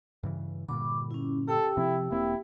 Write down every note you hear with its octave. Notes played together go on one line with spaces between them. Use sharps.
G2 C#3 E3
G2 A#2 D3 B5 D6
C#4 E4
G4 A4 G5 E6
C3 F3 C4 E4
E1 A#3 C4 E4